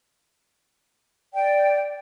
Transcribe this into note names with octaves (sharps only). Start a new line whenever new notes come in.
D5 G5